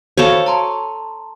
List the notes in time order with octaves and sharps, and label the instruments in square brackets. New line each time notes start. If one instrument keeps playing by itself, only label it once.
[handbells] F#4 C5 F5 [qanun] A4 C#5
[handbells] A5 A#5 C6